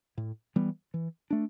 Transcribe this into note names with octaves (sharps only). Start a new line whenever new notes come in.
A2
E3 G3 B3
E3
A3 D4